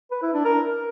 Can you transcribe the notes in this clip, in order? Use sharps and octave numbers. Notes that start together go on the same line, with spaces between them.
B4
E4
D4
A#4